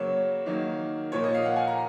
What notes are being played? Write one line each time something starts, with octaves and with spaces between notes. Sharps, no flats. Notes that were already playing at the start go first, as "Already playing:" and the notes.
Already playing: C#3 F#3 A#3 C#5
D#3 F#3 A#3
A#2 F3 A#3 C#5
D#5
F5
F#5
G#5
A#5